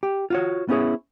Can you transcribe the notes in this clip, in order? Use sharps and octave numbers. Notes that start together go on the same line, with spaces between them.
G4
F4 F#4 C#5
B3 C#4 E4 G#4 C#5